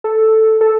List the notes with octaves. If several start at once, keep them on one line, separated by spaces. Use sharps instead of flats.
A4
A4